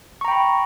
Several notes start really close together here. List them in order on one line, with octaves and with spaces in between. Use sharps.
C#6 A#5 G5 B5